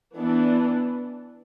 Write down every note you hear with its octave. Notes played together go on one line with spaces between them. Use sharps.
E3 B3 D4